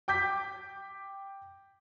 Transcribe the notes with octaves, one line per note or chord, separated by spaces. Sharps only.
G5 D6 G6 B6